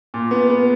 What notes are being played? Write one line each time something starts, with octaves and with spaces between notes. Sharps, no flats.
A#2
B3
B3